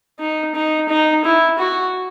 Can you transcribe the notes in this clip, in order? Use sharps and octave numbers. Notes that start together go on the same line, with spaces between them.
D#4
D#4
D#4
E4
F#4